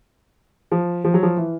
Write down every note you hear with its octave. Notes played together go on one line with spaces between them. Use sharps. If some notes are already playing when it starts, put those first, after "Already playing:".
F3
F3
F#3
F3
E3